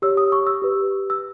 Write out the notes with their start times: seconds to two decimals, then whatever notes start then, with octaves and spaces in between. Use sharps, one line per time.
0.02 G4 C#5 E6
0.17 D#6
0.32 C#6
0.47 E6
0.62 G4 B4
1.10 E6